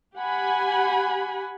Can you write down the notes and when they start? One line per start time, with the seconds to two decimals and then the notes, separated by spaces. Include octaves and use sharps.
0.15 G4 F#5 G#5 B5